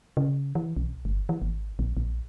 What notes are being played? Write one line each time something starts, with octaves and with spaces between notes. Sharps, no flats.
C#3
E3
B1
G1
E3
G#1
A#1
A#1